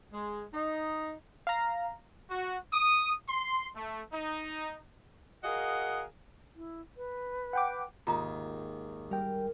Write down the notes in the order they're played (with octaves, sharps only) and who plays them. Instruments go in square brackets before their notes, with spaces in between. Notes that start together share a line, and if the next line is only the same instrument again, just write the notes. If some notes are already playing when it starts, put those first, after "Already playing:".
[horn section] G#3
D#4
[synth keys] F5 A#5
[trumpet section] F#4
D#6
C6
A3
D#4
[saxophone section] F#4 G#4 A#4 D#5 F5 F#5
[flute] E4
B4
[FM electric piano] F#5 G5 D6
[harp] G#1 [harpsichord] D#2 [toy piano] F4 A#5 D#6
[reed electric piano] G3 G5 [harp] A#4